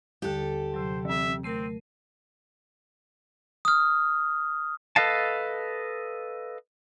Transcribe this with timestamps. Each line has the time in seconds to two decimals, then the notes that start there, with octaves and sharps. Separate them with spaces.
0.22 D#2 D3 G3 G4 A4
0.74 C3 F#3 C5
1.05 E3 C4 E5
1.44 A3 C4 A#4 C7 D#7
3.65 D#6 F6
4.96 A4 B4 D#5 F5 A5